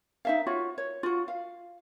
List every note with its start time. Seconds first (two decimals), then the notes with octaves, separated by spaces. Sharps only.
0.25 D#4 E5 F5
0.47 F4 F#4 C#5
0.78 C#5
1.03 F4 F#4
1.28 F5